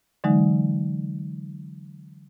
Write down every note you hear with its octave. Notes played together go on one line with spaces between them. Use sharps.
D3 E3 F#3 G#3 D#4